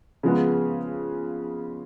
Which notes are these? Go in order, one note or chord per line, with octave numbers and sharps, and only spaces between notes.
C#3 F3 G#3 B3